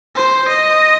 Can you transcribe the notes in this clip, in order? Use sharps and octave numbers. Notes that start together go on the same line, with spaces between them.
C5
D#5